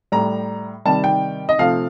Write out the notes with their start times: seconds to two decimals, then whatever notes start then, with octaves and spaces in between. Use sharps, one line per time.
0.12 A2 G3 A#5
0.85 C3 D#3 G3 A5
1.04 G5
1.49 D#5
1.59 C3 F3 A3 F5